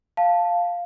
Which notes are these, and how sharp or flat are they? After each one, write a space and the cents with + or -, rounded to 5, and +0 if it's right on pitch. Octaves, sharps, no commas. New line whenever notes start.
F5 +0 A5 +0